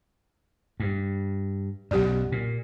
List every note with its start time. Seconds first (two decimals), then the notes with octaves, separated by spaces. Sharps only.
0.80 G2
1.91 B1 F#2 G4 D5
2.32 A#2